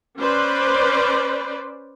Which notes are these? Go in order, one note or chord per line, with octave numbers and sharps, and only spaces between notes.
C#4 B4 C5 D5